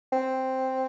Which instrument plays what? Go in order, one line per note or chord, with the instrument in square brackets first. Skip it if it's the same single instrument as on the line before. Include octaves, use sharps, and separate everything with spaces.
[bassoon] C4